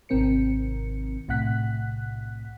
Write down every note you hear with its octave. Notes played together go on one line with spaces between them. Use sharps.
G#1 C3 D#3 C4 A#4 C#7
B1 A2 C3 F#5 F#6 B6